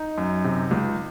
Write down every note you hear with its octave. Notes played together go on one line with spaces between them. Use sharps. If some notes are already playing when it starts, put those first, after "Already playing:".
Already playing: D#4
F#2
C3
C#2